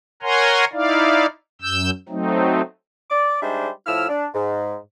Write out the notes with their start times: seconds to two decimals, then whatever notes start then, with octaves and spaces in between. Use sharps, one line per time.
0.22 A#4 C#5 F#5 G#5 A#5 C6
0.73 D#4 E4 D5 F5
1.62 F#2 E6 G6
2.09 F#3 A3 C4 D#4
3.10 D5 D6
3.41 G3 G#3 D4 D#4 C5 E5
3.87 A2 F3 E4 E6 F6
4.09 D4
4.34 G#2